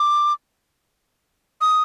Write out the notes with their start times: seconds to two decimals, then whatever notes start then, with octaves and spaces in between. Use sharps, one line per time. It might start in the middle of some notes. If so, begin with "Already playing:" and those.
Already playing: D6
1.61 D#6